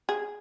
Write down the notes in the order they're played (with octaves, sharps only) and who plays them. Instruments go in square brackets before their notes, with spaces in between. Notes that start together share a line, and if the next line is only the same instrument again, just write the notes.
[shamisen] G#4